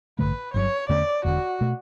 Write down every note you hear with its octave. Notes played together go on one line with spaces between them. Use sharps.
A1 G2 D3 A3 B4
G1 G2 F#3 C#5
E2 D3 A3 C#4 D5
E1 E2 D3 F#4
B2 A3